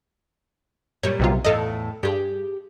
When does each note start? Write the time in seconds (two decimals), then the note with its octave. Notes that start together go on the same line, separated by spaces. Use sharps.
1.03 A#2 G3 C#5
1.19 B1 C3 F4
1.44 E2 A2 A4 D#5 F5
2.03 G2 G4 G#4